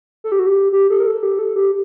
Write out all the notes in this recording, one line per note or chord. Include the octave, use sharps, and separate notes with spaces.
A4
G4
F#4
G4
G4
A4
A#4
A4
G4
A4
G4